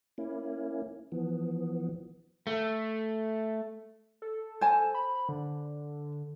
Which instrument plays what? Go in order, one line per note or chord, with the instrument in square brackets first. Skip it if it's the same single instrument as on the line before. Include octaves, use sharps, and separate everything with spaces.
[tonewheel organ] A#3 C#4 E4
E3 F3 B3
[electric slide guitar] A3
[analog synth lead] A4
[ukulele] C5 G#5 A5
[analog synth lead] B5
D3